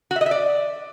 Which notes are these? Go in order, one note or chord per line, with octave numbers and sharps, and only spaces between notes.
F#4
E5
D#5
E5
D5